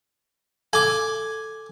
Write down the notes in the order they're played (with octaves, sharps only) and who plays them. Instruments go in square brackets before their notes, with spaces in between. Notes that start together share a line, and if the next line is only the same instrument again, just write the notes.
[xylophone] A4 [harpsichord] G#5 D6